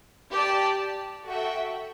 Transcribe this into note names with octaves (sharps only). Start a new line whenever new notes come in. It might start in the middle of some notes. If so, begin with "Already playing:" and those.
G4 D5 A5
F#4 A4 E5 G5